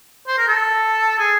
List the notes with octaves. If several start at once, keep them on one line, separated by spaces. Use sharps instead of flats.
C5
A#4
A4
G#4